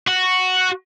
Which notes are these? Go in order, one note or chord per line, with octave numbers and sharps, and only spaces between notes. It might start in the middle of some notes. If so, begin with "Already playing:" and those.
F#4